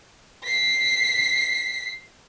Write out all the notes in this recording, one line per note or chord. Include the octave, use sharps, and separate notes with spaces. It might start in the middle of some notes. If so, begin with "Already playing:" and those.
B6 C7